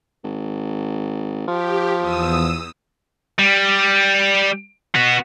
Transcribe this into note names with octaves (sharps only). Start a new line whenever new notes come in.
G#1
F3 G4
E2 D#6 E6
G3
B3 F#4